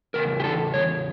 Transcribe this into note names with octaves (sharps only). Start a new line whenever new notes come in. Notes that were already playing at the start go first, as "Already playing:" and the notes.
E2 C#3 A#4
G4
A4
C#5